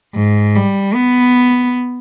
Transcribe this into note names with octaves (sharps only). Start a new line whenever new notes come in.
G#2
G3
B3